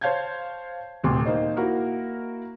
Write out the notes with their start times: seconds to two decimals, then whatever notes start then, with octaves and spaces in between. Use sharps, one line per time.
0.01 C5 C#5 F5 A5 G6 G#6
1.03 D#1 D2 C3 C6
1.25 A#3 D#4 C5 D#5
1.57 A#3 E4 F#4 A#4